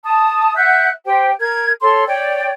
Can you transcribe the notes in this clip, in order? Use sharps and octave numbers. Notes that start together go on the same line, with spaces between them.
A5 D#6
E5 F#5 F#6 G6
G4 C5 G5
A#4 G#6
A4 C#5 C6
C#5 D5 G5